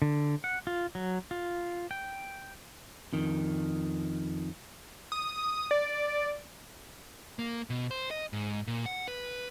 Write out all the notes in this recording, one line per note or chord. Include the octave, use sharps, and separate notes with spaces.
D3
F#5
F4
F#3
F4
G5
F2 D#3
D#6
D5
A#3
B2
C5
D#5
G#2
A#2
F#5
B4